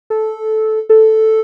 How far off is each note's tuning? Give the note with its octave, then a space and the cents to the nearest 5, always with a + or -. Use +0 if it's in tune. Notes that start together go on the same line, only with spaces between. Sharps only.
A4 -10
A4 +0